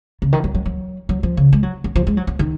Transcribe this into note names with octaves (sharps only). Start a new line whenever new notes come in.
C#3
D#3
F#3
F#3
F#3
F#3
F3
C#3
G#3
F#3
F#3
F3
G#3
F#3
F#3
D#3